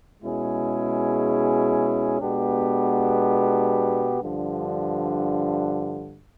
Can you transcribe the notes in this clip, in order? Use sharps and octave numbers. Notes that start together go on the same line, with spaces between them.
B2 G#3 C#4 E4 G#4
B2 G#3 B3 D4 G4
G2 D3 F3